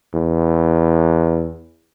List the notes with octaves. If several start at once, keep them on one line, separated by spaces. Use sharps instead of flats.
E2